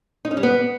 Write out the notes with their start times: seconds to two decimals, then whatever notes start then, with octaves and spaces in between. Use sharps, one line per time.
0.25 D#4
0.31 C#4
0.37 G3
0.43 B3